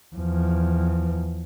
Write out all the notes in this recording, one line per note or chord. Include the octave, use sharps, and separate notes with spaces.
E2 F3